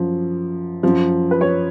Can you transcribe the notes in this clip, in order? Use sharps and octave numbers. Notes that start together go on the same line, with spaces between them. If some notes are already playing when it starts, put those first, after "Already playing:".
Already playing: F#2 F3
F#2 F3
B4
C#5